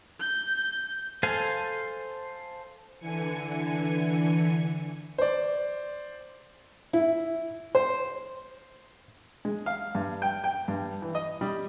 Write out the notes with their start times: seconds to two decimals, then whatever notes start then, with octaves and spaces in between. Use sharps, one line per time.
0.20 G6
1.23 A4 C5 F5 G#5
2.99 D3 E3 G#5 C#7
5.18 C5 D5
6.93 E4
7.75 C5
9.45 G#3
9.66 F5
9.95 G2
10.22 G5
10.44 G5
10.68 G2
11.02 E3
11.15 D#5
11.41 G3